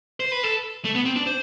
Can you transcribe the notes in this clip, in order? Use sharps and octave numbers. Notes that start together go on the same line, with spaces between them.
C5
B4
A4
A3
B3
C4
D4
C5